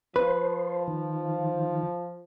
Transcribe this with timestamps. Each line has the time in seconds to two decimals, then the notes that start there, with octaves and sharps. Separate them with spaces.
0.16 F3 B4 C5
0.87 D#3